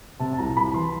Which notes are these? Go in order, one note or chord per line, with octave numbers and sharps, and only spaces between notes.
C3 A5
A5
C2 A#5
C2 B5
E3 C6